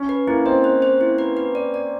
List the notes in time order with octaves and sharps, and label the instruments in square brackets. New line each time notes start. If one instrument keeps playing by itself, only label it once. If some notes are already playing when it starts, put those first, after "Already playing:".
Already playing: [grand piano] C#4
[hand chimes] B4
[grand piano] A#3 [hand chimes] E4
[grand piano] C4 [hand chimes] D#5
[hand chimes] C5
C5
E4
B4
B4
D5
D5